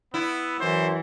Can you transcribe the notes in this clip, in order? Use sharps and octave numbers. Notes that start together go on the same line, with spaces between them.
B3 E4
F#2 E3 C5